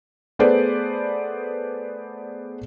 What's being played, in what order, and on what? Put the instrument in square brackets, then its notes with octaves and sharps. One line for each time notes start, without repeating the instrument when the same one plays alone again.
[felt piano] A3 B3 G#4 B4 C5 D5